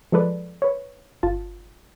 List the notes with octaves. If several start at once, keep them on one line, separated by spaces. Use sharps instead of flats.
F3 G#3 A4 B4 D5
B4 C#5
G1 F4 A5